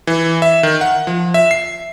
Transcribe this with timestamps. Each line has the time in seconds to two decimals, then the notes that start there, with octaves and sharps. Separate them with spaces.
0.07 E3
0.42 E5
0.63 D#3
0.81 F#5
1.07 F3
1.34 E5
1.51 C7